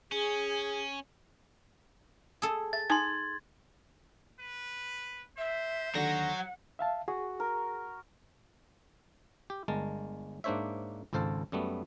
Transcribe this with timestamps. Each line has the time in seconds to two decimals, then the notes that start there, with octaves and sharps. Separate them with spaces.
0.12 C#4 G#4
2.42 G#4 A4
2.73 E5 A6
2.90 D#4 G#5 A5 C6 G#6
4.40 B4
5.38 C5 E5
5.95 D#2 D3 F#3 F#4 F#5 A#6
6.79 E5 F5 A5
7.08 F#4 G#4
7.40 A#4
9.50 G4
9.68 G1 G#3 A#4 A5
10.44 G#2 A#3 D4 C5 C#5 E5
11.13 G#1 C#2 A4 C5 F5 A5
11.52 F#2 G3 A3 B3